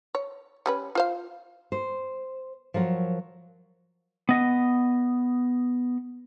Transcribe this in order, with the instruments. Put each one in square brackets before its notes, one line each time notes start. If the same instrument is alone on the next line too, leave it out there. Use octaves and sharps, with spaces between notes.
[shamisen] C#5
G3 C#4 B4
F4 C5 F5
[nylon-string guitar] C5
F3 F#3 A#4 C#5
[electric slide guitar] B3 D#5